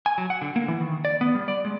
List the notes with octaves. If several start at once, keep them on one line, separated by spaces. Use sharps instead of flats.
G#5
F#3
F#5
D3
A#3
E3
D#3
D5
B3
G3
D5
G#3